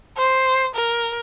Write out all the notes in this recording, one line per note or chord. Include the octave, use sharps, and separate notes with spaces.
C5
A#4